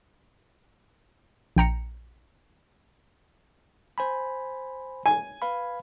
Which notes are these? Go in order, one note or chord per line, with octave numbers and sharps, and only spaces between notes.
A#1 G5 A#5 C#7
C5 G#5 B5
G#5
B4 F5 B5